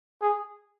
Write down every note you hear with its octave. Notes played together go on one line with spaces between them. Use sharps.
G#4